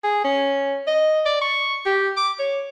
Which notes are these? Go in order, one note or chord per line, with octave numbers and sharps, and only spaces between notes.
G#4
C#4
D#5
D5
C#6
G4
D6
C#5